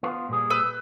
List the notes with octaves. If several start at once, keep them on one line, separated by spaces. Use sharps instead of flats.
B3 F4 C5
A#2 G3 G#4
B4 E6 G6